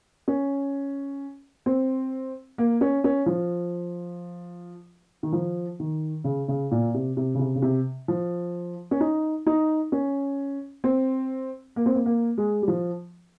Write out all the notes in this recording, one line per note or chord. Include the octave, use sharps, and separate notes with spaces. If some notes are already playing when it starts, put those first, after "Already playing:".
C#4
C4
A#3
C#4
C#4
F3
D#3
F3
D#3
C#3
C#3
A#2
C3
C3
C#3
C3
C#3
C3
F3
C#4
D#4
D#4
C#4
C4
A#3
C4
A#3
A#3
G#3
G3
F3